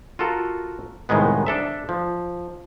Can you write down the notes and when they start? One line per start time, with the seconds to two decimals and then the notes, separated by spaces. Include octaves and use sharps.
0.19 F4 F#4 A4 A#4
1.09 C2 A2 D#3 G#3 B3
1.47 D4 A4 E5
1.89 F3